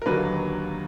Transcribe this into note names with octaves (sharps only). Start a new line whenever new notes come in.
A#4
D#2 D3 F#3 A#3 B4